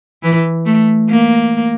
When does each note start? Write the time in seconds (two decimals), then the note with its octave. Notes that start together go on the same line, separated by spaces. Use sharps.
0.23 E3
0.66 A3
1.09 A#3